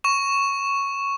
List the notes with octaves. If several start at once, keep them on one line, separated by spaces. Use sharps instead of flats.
C#6 E7